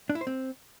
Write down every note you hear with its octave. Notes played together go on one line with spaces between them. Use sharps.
D4
E4
C5
C4